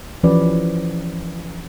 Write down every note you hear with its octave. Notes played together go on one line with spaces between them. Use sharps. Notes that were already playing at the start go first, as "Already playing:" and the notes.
E3 F3 C#4 G4 B4 D5